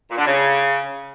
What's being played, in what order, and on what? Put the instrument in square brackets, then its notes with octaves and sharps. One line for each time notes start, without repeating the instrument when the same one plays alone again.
[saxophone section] A#2
D3
C#3